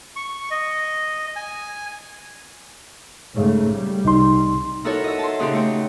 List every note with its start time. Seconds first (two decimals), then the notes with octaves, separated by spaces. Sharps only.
0.16 C#6
0.51 D#5
1.36 G#5
3.35 G#2 C#3 A3
3.70 G3
4.05 C2 D#4 C6
4.85 D#4 E4 F#4 A4 A#4 C#5
5.04 D#5 E5
5.19 A5 C6
5.39 A#2 C#3 D#4 F#4 G4 C6
5.53 A3 C#5 G5